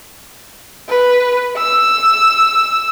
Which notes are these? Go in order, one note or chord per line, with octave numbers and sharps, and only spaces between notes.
B4
E6